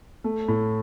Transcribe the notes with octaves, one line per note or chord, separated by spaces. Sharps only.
A3
A2